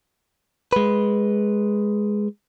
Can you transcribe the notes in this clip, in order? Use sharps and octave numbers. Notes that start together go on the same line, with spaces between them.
G#3 B4